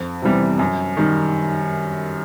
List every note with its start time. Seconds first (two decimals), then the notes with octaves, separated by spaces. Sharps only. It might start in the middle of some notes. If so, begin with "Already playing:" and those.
Already playing: F2
0.22 C3 E3 G3 B3
0.59 F#2
0.97 D#3 G3